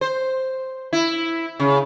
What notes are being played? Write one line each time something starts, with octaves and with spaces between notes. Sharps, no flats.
C5
E4
C#3